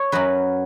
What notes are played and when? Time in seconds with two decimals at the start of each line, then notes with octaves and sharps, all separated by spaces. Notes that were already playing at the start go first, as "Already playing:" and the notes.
Already playing: C#5
0.12 F#2 F#3 B4